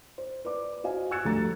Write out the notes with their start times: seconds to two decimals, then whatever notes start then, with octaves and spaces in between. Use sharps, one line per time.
0.18 C5
0.45 B4 D5 D6
0.84 F#4 C5 D#5 F5 G#5
1.11 E6 F#6 G#6 A6 C#7 E7
1.25 D2 F3 G3 A4 A#5 A6